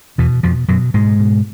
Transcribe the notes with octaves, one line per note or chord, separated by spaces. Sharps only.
E2 B2 E3
F2 B2 F3
F#2 B2 F#3
G#2 B2 G#3
B2